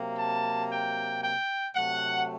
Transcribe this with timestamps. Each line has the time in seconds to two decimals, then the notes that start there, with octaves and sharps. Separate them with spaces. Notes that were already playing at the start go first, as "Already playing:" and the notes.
Already playing: C3 F#3 A#3
0.17 A5
0.70 G5
1.22 G5
1.75 C3 F#3 A3 F#5